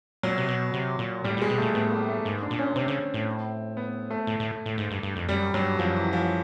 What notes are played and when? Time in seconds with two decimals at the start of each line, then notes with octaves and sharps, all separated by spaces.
0.23 A#2 F#3
0.38 C3
0.48 B2
0.74 C3
0.99 A#2
1.24 A2 G3
1.37 A#2 G#3
1.49 B2
1.58 A#2 A3
1.74 A2 B3
1.92 A#3
2.08 A3
2.25 G#2
2.42 D4
2.51 A#2
2.59 C#4
2.76 C3 C4
2.88 C#3
3.14 A2
3.77 B3
4.10 A3
4.27 A2
4.40 A2
4.66 A2
4.78 G#2
4.91 G2
5.03 G2
5.16 F2
5.29 F#2 G3
5.54 G2 F#3
5.79 F#2 F3
5.96 E3
6.13 F3